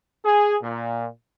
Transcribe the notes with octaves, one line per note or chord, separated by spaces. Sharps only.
G#4
A#2